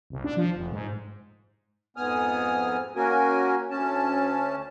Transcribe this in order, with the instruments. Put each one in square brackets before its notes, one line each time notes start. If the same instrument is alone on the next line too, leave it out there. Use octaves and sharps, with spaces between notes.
[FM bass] C2
D4
F3
F1
G#2
[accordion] F2 G#2 B3 G#5 D#6 F6
A#3 C#4 F#4 A#4 G#5
D2 C#4 A5